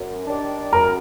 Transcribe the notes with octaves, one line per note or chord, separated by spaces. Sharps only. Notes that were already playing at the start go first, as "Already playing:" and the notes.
Already playing: F#2
D#3 G3 D4
F#2 A#4